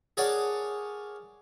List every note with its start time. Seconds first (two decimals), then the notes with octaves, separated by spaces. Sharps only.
0.17 G#4 A#4 C#5 D5 F#5 A5